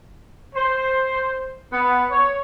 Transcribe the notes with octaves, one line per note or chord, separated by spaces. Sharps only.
C5
B3
C#5